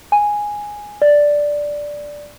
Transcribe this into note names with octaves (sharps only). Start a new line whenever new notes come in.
G#5
D5